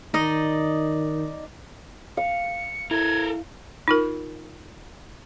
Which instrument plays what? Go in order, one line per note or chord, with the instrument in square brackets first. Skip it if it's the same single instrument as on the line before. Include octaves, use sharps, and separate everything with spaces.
[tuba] D#3 [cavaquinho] D#4 D5 D#5
[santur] F5 [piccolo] C#7
[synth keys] E4 [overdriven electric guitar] A4 A#4 [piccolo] G#6
[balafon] D#4 F4 A#4